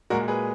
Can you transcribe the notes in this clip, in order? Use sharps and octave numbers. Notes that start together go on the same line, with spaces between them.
A#2 G#3 F#4 A#4
G#4 B4